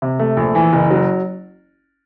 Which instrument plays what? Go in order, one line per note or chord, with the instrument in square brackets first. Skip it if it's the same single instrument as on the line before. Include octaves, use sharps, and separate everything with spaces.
[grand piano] C3
A3
A#1
E3
F#1
F#3